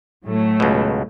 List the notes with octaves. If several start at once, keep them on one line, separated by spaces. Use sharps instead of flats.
A2 F#3 A3
C#2 B2